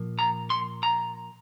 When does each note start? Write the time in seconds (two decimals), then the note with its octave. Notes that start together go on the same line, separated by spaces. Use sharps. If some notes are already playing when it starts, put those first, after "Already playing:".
Already playing: A#2 F3 A#3
0.19 A#5
0.50 C6
0.83 A#5